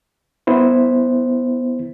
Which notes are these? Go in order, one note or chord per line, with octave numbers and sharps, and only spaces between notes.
B3 E4 C5